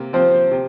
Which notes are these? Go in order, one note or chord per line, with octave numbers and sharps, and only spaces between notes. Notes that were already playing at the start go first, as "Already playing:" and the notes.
Already playing: C3 A#3
F3 C4 C5
C3